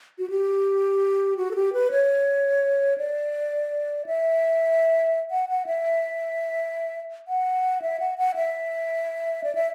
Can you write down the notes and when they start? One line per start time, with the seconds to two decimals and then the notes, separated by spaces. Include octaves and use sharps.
0.18 F#4
0.30 G4
1.37 F#4
1.51 A4
1.55 G4
1.73 B4
1.91 C#5
2.98 D5
4.06 E5
5.31 F#5
5.49 F#5
5.66 E5
7.28 F#5
7.82 E5
8.00 F#5
8.18 F#5
8.35 E5
9.44 D5
9.55 E5